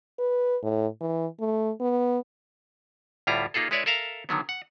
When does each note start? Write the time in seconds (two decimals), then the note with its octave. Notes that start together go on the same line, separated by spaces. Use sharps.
0.19 B4
0.63 A2
1.01 E3
1.40 A3
1.80 B3
3.27 D2 A2 G3 E4 F4 A#5
3.54 A#3 D#4 F4 G#4 A4
3.71 G#3 E4 B4 C#5 D5 E5
3.86 A4 A#4 E5 F5 A#5
4.29 D3 D#3 F#3 B3
4.49 F#5